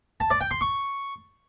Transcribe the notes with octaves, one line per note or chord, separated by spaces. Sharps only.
A5
D5
G5
C6
C#6